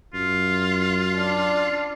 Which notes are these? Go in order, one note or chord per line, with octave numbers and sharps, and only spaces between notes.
F#2 F4
D4